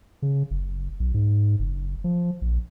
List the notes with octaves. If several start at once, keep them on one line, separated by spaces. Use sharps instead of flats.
C#3
F#1
B1
G#2
F#1
F3
A#1